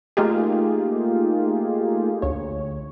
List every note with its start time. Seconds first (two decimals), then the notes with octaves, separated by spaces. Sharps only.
0.17 A3 A#3 D#4 F4 G4 G#4
2.22 D2 C#5